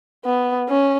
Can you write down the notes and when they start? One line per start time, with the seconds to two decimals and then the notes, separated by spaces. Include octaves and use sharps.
0.25 B3
0.69 C#4